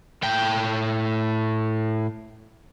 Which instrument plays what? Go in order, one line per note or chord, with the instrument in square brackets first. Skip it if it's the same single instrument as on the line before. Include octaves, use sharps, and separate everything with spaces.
[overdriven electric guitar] A2 G5